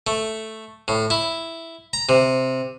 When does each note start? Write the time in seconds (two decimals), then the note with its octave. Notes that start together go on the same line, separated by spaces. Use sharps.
0.07 A3
0.88 A2
1.10 E4
1.93 A#5
2.09 C3